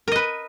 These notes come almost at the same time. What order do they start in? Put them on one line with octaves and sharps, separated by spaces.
A#4 D#5 B4